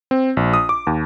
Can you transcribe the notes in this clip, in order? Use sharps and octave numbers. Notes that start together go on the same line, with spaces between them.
C4
A#1
D#6
D6
D#2